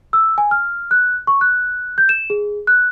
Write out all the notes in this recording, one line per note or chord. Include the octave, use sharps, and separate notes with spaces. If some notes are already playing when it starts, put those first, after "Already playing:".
E6
G#5
F6
F#6
C#6
F#6
G6
E7
G#4
F#6